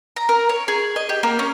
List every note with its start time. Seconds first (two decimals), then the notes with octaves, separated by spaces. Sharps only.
0.16 A#5
0.29 A#4
0.49 C#5
0.68 G#4
0.96 D#5
1.09 G4
1.23 A#3
1.39 C#4